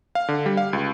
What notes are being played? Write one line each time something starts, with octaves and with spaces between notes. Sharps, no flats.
F5
D3
G3
F5
C#2